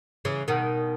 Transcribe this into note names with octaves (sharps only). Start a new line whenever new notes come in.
C#3 E3
B2 D#3